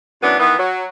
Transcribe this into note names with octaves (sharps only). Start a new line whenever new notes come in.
F#2 E3 B3 D4
D#3 E3 B3
F#3